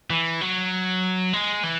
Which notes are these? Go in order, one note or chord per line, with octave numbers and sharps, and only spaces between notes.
E3
F#3
G#3
E3